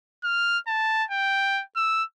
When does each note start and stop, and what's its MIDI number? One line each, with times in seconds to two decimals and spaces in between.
0.24 0.58 89
0.67 1.04 81
1.11 1.63 79
1.76 2.03 88